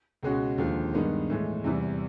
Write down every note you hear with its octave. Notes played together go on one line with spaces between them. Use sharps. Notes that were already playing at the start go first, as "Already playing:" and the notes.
C#2 B2 G#3 C#4 F#4
D#2 D3 F3 G#3
G2 D#3 G#3 B3 D#4
A2 E3 G#3
E2 C3 E3 G3